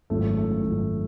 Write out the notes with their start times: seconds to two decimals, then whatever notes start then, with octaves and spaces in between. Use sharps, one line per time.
0.10 G#1 F#2 F3 A3
0.37 A3
0.63 G#1 F#2 F3